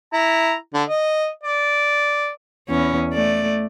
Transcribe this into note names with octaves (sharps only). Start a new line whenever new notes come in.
E4 A#5
D3
D#5
D5
E2 C#4
A3 D5